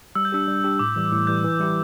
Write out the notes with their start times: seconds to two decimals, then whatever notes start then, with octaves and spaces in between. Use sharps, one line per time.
0.15 G3 E6
0.25 G6
0.32 D4 G4 E6
0.48 G3
0.64 D4 G4
0.79 A2 D6
0.96 E3 G3
1.12 A2 E6
1.27 E3 G3 G6
1.44 E3
1.59 G3 E4 G4